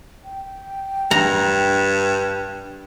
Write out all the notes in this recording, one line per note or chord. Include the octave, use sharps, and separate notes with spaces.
G5
G2 A#5